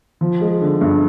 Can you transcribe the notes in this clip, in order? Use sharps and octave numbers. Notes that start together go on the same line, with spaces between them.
F3
G#3
D3
G2